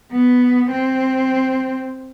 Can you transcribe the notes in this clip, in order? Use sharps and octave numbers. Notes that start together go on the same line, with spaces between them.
B3
C4